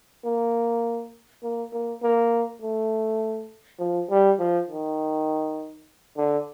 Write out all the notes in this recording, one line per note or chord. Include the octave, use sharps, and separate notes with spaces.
A#3
A#3
A#3
A#3
A3
F3
G3
F3
D#3
D3